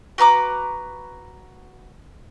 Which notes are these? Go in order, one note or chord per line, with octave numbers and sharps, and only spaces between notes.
F#4 B4 A#5 D6